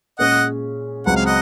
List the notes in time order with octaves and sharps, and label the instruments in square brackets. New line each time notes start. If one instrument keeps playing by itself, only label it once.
[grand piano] A#2 G#3 C#4 G#4 [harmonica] D#5 F#5
[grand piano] C#2 C#3 F#3 C4 [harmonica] F#5
[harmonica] F5
D#5 F#5